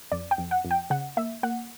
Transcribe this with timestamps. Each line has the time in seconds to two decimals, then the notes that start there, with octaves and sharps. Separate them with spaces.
0.12 F2 D5
0.31 G5
0.38 F2
0.51 F#5
0.65 F2
0.71 G5
0.90 C#3 F#5
1.17 A#3 E5
1.43 A#3 F#5